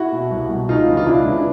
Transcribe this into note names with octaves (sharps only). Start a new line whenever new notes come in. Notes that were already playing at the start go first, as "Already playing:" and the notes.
Already playing: E4 F#4
B2
C2
B2
C#2 D#4 F4
C#3 E3
F4
C#2 D4 E4
C#3 E3